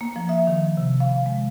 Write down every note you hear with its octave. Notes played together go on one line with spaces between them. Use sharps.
A#3
F3
E5
D#3
C3
F5
G#3